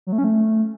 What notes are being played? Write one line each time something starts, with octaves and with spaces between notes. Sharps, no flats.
F#3
A3
C#4
A3